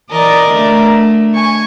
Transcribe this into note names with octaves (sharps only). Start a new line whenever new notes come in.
E3 A#4 D5 D#5
D3 A3
G#5 C#6